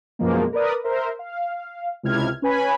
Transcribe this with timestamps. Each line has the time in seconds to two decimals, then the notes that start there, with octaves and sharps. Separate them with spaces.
0.19 F#2 B2 F3 G#3 A#3
0.53 A#4 B4 D5 D#6
0.84 A#4 C5 E5
1.19 F5
2.03 C#2 C3 E4 F6 G#6
2.42 C#4 B4 G#5 B5